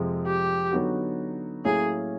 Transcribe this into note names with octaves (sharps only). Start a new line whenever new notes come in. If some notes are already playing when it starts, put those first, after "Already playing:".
Already playing: F2 C3 F3 G#3
G4
D3 F#3 B3 D#4 F#4
A2 F#3 A#3 C#4 E4 G#4